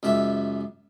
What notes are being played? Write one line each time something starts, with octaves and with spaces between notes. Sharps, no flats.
C#2 F#2 E5